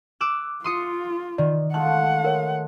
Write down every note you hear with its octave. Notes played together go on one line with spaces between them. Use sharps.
D6 E6 F#6
F4 C6 D#6 C#7
D#3 D5
G#3 A3 F4 F#5 A5 F#6
A#4 C#5